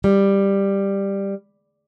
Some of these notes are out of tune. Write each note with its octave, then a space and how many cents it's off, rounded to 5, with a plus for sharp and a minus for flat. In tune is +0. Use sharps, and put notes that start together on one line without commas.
G3 +10